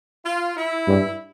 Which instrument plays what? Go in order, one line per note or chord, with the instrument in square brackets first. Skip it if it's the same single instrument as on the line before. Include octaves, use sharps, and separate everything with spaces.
[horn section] F4
E4
[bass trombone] G2